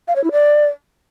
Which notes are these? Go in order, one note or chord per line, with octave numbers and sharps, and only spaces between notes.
F5
C#5
E4
D5